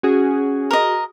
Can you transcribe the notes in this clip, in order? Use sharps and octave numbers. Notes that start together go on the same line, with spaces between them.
C#4 F#4 G#4
A#4 D#5